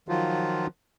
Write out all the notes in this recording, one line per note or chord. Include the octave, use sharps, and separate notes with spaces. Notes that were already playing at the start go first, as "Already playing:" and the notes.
D#3 F3 F#3 F4